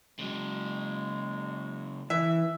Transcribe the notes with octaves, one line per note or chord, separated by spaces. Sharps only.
C#3 F#3 G#3
E3 E5